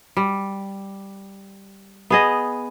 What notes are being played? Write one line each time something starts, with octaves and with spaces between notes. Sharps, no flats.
G3
B3 G#4 D#5